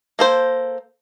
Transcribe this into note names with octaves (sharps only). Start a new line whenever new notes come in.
A#3 A4 C5